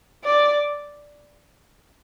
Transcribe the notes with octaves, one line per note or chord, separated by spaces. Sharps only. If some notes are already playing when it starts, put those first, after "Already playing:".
D5